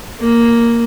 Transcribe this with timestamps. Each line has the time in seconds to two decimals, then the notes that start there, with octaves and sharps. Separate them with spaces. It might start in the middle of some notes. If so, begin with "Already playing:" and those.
0.20 A#3